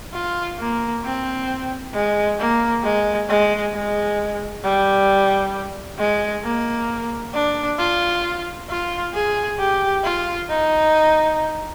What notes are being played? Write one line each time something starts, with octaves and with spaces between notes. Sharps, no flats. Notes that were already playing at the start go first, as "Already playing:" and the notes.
F4
A#3
C4
G#3
A#3
G#3
G#3
G#3
G3
G#3
A#3
D4
F4
F4
G#4
G4
F4
D#4